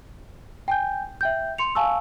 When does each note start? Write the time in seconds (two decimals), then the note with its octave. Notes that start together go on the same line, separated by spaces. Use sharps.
0.68 G5 G#5 G6
1.21 E5 G5 G6
1.58 C6 C#7 F7
1.75 F5 G#5 A5 C#6 E6